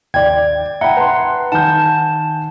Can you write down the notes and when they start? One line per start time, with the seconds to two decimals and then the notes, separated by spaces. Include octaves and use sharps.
0.14 D#2 D5 G5 G#6
0.81 E5 F#5 G5 A#5 B5
0.97 B4 A5 C6
1.52 D#3 D#4 F#5 G#5 A5 G6